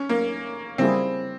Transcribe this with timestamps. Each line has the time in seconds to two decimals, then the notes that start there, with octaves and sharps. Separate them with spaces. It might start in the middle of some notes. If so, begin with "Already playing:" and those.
Already playing: C#4
0.09 A#3
0.78 C#3 G3 A#3 C4 E4 G#4